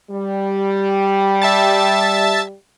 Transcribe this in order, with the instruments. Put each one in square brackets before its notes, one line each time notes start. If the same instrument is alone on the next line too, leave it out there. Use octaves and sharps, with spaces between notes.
[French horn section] G3
[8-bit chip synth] E5 A5 A6